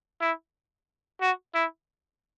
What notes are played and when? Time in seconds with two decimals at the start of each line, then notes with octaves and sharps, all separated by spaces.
0.21 E4
1.21 F#4
1.55 E4